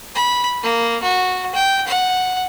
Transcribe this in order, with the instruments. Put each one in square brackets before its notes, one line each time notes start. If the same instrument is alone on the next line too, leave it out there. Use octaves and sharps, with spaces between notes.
[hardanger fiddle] B5
A#3
F#4
G5
F#5